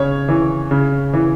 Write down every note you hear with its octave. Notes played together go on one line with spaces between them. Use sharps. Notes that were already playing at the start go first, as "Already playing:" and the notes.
Already playing: C#3 C#5
E3
C#3
E3